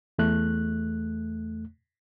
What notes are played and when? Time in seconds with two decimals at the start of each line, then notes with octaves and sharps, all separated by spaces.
0.19 E2 A3 F#6